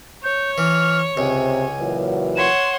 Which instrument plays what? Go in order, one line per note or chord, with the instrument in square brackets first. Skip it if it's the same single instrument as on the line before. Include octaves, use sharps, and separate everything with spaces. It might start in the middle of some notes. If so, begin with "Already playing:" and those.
[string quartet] C#5 [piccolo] G6
[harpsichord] E3 [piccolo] F6
[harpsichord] C#2 [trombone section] C3 [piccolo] G#5
[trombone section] A#2 E3 F#3
[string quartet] C#5 F#5 C6 [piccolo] E7